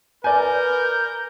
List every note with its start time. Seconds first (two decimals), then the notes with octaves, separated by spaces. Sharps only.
0.24 A#4 B4 D5 G#5 G6